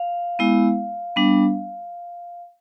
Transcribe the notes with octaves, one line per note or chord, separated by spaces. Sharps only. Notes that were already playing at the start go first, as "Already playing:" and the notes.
Already playing: F5
G#3 B3 E4
G3 B3 D4